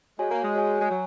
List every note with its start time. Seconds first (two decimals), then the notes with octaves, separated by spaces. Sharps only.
0.19 G#3 F#4 C#5 G#5
0.31 A#3
0.43 G#3
0.55 F#4 C#5 G#5
0.81 G#3
0.90 F#3 G#5